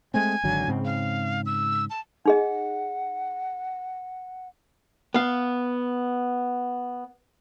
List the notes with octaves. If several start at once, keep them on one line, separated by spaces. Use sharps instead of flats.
G#3 A3 C4 G#5
G#1 D3 F#3
G#2 C#3 C4
F5
E6
A5
D#4 G#4 D#5 F#5
B3 F5